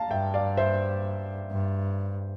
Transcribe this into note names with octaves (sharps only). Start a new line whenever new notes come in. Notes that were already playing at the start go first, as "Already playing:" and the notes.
Already playing: F5 A5 A#5
G2 E5 G5
D5 F5
C5 E5
G2